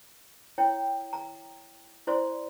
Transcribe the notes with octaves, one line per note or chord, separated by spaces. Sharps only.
E4 C#5 G5
A#5
E4 C5 D5 C6